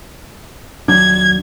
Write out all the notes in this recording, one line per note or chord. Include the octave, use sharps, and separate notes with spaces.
D#1 F#3 D4 G#6